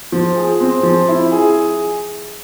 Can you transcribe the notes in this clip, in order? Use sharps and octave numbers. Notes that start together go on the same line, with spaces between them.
F3
G#4
C4
F3
E4
G#4